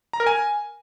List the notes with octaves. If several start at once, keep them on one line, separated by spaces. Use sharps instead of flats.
A#5
A#4
G#5